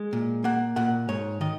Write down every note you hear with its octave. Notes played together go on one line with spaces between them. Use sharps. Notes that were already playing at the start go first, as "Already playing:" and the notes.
Already playing: G#3
A#2
A#3 F#5
A#2 F#5
G#2 C#5
D#3 D#5